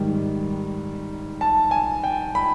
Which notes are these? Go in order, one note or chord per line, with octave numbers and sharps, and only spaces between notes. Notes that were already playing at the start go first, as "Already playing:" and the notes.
Already playing: G#2 D#3 G3
A5
G#5
G5
B5